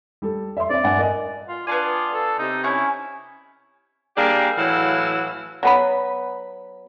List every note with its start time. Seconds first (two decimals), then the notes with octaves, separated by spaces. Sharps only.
0.22 G3 A4
0.57 E5 C6
0.70 C4 D5 E5
0.84 G2 F#5 G#5
0.98 A#4 D#5 G#5
1.48 F4
1.67 B3 D4 F4 D5 G#5
2.13 A4
2.39 C3 D#4
2.64 C#4 E4 C#6 G6
4.16 G3 A#3 D4 G4 G#4
4.57 A2 E3 F#3 E4 F5 F#5
5.63 F#3 B3 B5